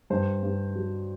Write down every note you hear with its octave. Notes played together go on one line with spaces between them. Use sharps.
G2 C5
G2
F#3